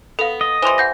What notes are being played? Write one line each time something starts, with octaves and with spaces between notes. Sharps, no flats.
B3 A4 F5
D#5
E3 G3 C5 C6
F#5 G6 A#6